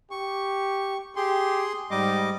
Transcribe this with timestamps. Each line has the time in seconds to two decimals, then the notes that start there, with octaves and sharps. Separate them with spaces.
0.11 G4 C#6
1.16 G4 G#4 C6
1.91 G#2 G3 D#5 D6